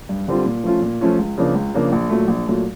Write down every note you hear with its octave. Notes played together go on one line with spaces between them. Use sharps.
G2
D3 G3 C4 F4
A#2
F3 A3 C#4 F4
A#2
F3 A3 C#4 F4
C#2
C#3 F3 A#3 D4
C#2
C#3 F3 A#3 D4
A#1
A#2 F#3 A3
A#1
A#2 F#3 A3